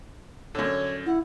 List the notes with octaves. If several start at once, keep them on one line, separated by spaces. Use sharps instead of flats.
F#2 D3 C#5
E4 F#5